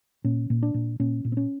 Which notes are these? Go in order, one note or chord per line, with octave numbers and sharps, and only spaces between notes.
A#2 C#4
A#2
D4
A#2
A#2 C#4
A#2
C4
C#4